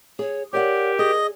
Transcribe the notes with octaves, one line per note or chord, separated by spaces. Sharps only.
G#4 C#5
G4 A#4 C#5 D5 F#5
G#4 D#5